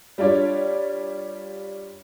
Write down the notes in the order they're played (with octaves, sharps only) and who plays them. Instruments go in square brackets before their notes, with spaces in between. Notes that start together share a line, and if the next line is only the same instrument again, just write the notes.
[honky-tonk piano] G3 D4 F4 C#5 D5